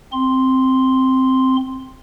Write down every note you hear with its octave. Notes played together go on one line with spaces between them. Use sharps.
C4 C6